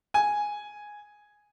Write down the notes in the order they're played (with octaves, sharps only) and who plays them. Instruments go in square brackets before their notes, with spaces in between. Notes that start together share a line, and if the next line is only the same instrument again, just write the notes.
[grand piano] G#5